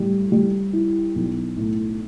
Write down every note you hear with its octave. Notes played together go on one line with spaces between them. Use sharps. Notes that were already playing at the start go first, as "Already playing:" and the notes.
Already playing: A2 G3
G3
E4
B1
A2